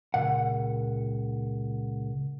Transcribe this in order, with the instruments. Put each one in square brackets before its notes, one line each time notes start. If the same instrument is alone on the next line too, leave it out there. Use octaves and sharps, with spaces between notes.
[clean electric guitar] C#2 G2 A#2 F#5